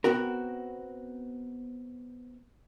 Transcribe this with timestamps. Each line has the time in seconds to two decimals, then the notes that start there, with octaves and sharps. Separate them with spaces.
0.04 B3 C4 F#4 A#4